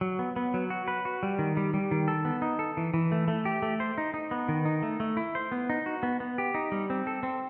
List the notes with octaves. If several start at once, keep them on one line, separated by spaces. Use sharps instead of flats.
F#3
B3
B3
F#3
F#4
B4
F#4
G3
D#3
G3
G3
D#3
A4
B3
D#4
A4
E3
E3
A3
A3
G4
A3
C5
D#4
D#4
B3
D#3
D#4
A3
A3
E4
C5
B3
D#4
F#4
B3
B3
G4
D#4
G3
C4
A4
C4